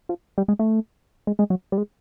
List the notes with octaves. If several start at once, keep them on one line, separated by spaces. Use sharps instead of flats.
F3
G3
G#3
A3
G#3
G#3
F#3
G3
G#3